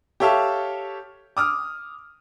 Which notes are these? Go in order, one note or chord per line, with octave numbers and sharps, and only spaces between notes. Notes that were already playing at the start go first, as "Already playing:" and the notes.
G4 A4 C#5 E5 F5 A5
D6 D#6 F6